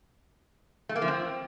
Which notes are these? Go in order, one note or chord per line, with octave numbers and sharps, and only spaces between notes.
A3
A#3
F3
C4